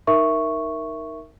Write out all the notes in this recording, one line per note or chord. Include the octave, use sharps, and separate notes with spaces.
D#4 A#4 E5 C#6